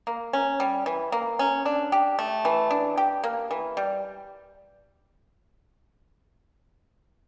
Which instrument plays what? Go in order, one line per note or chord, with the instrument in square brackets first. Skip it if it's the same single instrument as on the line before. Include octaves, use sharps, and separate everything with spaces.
[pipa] A#3
C#4
G3
E3
A#3
C#4
D4
G4
A3
E3
D4
G4
A#3
E3
G3